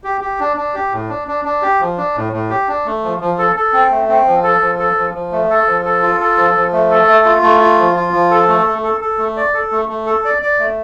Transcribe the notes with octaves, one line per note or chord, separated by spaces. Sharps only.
G4
G4
D4
D4
G4
A2
D4
D4
D4
G4
F3
D4
A2
A2
G4
D4
A3
F3
F3
A4
A4
C4
A3
C4
F3
A4
F3
A4
F3
F3
A3
A4
F3
A4
F4
A4
F3
F3
A3
A4
A3
F4
A3
F4
F3
F4
F3
A4
A3
A3
A4
A4
A3
D5
A4
A3
A3
A4
D5
D5
A3